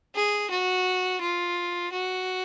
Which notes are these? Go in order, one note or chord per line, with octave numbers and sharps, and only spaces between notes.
G#4
F#4
F4
F#4